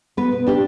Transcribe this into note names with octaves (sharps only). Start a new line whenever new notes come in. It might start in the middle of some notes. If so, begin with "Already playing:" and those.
B3 B4
B2
D4 G4